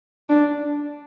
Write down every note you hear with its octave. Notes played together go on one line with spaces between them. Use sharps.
D4